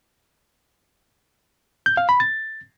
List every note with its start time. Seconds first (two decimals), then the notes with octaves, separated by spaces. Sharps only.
1.86 G6
1.97 F5
2.09 B5
2.20 A6